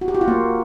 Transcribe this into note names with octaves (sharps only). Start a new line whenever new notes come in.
F#4
G4
F#4
F4
A#3